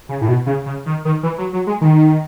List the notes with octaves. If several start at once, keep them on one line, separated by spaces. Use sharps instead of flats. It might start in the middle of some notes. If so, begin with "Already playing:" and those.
C#3
A2
B2
C#3
C#3
D#3
D#3
E3
F#3
F#3
G#3
D#3